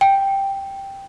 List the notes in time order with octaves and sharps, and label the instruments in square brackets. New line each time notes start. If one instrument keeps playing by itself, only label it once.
[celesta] G5